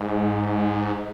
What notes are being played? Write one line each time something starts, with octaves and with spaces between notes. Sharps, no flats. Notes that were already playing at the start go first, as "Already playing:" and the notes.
Already playing: G#2